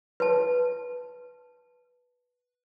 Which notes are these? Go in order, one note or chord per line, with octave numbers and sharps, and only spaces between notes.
B4 A5